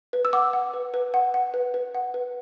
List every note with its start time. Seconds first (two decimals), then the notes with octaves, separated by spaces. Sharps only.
0.13 B4
0.25 E6
0.33 F#5 D6
0.53 F#5
0.74 B4
0.94 B4
1.14 F#5
1.34 F#5
1.54 B4
1.74 B4
1.95 F#5
2.14 B4